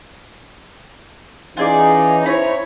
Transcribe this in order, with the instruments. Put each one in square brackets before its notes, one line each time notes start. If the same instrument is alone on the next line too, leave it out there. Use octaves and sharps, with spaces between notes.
[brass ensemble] E3 C#4 D#4 [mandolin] F4 G#4 D5
[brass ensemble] E4 C5 C#5 [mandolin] A#5 B5